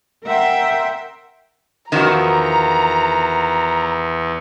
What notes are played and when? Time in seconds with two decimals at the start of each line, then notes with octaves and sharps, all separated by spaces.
0.25 A#4 E5 F#5 G5 C6
1.92 E2 D#3 F3 F#4 A#5